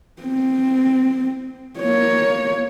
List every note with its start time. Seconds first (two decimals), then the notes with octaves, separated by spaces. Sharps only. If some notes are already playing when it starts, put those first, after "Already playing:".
0.23 C4
1.79 A#3 C#5